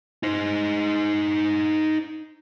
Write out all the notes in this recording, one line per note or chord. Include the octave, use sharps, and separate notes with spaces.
D#4 C5